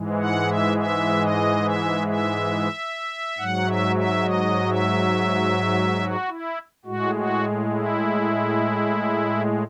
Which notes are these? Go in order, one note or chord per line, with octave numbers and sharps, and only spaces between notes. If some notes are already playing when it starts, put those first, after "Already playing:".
Already playing: G#2 E3 G#3
F#5
E5
E5
D#5
E5
E5
G#2 F#3 F#5
E5
E5
D#5
E5
F#4
E4
A2 G#3 F#4
F#4
E4